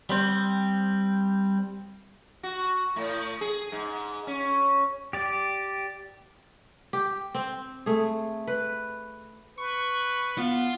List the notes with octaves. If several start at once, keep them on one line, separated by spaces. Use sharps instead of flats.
G3 C4
F#4
A2
G#4
G#2
C#4
G4 D5
G4
C4
A3 G#4
B4
B4 C#6
B3 F4